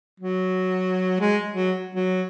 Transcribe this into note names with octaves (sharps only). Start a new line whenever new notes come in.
F#3
G#3
F#3
F#3